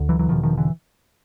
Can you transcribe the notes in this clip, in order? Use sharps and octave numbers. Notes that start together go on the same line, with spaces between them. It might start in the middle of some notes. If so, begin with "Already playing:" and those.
Already playing: D2 D3
E3 F#3
E3 F#3
E1 E2 B2 D#3 F3
D#3 F3
D3 E3